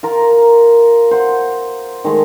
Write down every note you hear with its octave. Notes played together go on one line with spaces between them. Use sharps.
F4 A#4 A#5
C5 F#5
D#3 G#3 A3